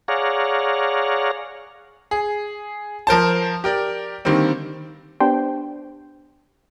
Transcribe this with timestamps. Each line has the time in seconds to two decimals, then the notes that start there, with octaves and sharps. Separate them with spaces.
0.08 G#4 C#5 D5 F5 F#5 A#5
2.11 G#4
3.07 F3 A#4 C5 A5
3.64 G4 A#4 D5
4.25 D3 D#3 G3 A#3 C4
5.20 B3 D4 G4 C5 G5